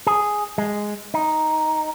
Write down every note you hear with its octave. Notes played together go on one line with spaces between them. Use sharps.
G#4
G#3
D#4